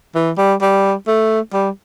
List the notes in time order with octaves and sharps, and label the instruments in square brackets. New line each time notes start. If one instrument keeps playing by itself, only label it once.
[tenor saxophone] E3
G3
G3
A3
G3